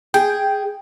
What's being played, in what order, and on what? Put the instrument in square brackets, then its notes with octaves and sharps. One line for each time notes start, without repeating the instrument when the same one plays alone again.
[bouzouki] G#4 [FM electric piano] G5